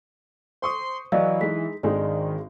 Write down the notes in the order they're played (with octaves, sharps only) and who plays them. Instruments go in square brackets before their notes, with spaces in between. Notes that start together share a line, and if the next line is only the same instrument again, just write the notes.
[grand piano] C5 C#6 D#6 [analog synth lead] C6
[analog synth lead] E3 [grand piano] F#3 [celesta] D5 D#5 F5
[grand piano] G#3 D#4 [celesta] B6
[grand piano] G#1 G#3 D4 [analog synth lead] D#3 [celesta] D5